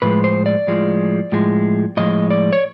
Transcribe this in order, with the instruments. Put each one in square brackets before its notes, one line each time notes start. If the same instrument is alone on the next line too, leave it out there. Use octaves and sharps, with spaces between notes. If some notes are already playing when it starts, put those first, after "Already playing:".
[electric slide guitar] A2 F3 G#3 B4
C5
D5
A2 F3 G#3
A2 F3 G#3
A2 F3 G#3 D#5
D5
C#5